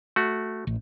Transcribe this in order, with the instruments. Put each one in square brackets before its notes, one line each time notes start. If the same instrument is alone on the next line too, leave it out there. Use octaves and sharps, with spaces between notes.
[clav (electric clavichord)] A3 F#4
[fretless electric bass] A1